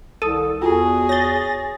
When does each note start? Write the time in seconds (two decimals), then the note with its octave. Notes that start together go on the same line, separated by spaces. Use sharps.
0.22 C2 D#3 A4 D#6 D#7
0.62 E2 F4 F#4 G#4
1.09 C#5 A6 A#6 G7